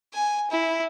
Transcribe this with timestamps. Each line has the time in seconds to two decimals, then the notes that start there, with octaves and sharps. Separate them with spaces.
0.14 G#5
0.51 E4